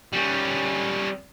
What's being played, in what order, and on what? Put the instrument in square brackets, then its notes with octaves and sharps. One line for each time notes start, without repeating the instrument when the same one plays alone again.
[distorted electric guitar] G3 C#4